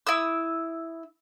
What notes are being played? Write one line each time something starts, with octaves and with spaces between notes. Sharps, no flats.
E4 D#6 E6